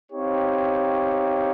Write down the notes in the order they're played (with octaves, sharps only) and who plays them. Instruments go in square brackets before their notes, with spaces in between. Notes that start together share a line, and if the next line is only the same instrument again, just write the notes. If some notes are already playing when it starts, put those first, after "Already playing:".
[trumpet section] C4 D#4 G4 C#5 F5